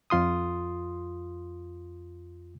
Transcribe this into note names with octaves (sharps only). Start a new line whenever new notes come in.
F2 F4 C6 D#6